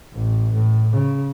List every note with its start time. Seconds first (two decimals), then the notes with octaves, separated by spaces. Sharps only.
0.13 A1
0.54 A2
0.93 C#3